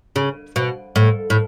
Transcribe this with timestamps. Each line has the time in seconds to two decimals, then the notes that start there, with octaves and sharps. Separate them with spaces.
0.16 C#3
0.56 B2
0.96 A2
1.30 A2